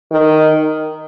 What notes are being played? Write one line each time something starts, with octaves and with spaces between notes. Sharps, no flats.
D#3